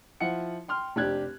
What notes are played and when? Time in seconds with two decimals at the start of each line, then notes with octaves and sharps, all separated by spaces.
0.20 F3 E4 F#5 C#7
0.68 G5 C6 F6
0.96 F1 D4 G4 F#6 G#6